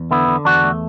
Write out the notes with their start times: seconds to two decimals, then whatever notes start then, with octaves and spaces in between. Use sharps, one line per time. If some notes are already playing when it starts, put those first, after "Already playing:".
Already playing: E2
0.11 D3 B3 E4
0.28 D3
0.45 E2 D4 F#4
0.64 A3